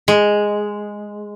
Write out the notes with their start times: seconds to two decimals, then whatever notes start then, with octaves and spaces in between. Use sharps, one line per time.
0.08 G#3